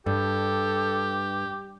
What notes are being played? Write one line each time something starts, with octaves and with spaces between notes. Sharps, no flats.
G2 G4 A4